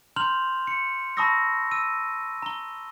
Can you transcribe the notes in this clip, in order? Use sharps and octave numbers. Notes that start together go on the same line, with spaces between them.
A#5 C6 F6 G6 F7 F#7
C#7
A5 B5 C#6 D#6 E6 A#6
E6 D#7
A#5 G7